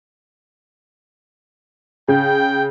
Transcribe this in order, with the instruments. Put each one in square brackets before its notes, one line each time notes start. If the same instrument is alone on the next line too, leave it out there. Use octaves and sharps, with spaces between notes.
[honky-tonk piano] C#3 [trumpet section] G5